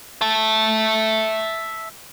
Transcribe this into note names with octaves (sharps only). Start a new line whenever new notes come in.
E5 A5